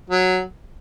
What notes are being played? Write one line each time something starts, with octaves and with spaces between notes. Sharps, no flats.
F#3